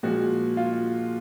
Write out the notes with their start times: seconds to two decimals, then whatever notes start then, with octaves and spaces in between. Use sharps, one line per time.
0.03 A#2 F3 G#3 F#4
0.57 F4